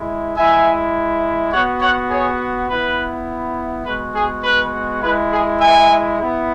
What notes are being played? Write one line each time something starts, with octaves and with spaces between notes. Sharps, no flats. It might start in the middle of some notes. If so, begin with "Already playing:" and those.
Already playing: G#3 E4
G#3 E4 E5 G#5
B3 F#4 C#5 F#5
C#5 F#5
G#4 C#5
B3 E4 B4
G#3 B3 F#4 B4
G#4
B4
G#3 E4 B4
G#4
E5 G#5
B3 E4